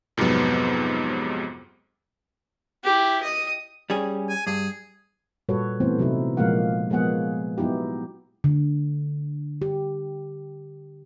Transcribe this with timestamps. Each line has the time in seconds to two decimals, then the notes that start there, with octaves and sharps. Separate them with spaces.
0.17 F2 G#2 C3 F#3 B3
2.84 E4 G4
3.22 D#5 D#6
3.90 G3 C#4 G#4
4.29 G#5
4.47 G2 G#4
5.49 A#2 G3 F#4 A4 B4 C#5
5.80 E3 A3 B3 C4 C5
5.98 C3 F#3 D#4 E4
6.37 A#2 F3 G#3 A#3 F5 F#5
6.90 F3 G#3 A#3 B3 G#4 F#5
7.58 F#3 B3 D#4 E4 G4
8.44 D3
9.62 G4